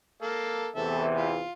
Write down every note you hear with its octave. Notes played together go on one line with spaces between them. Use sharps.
A#3 A4 F5
E2 C3 E3 A4 E5
F4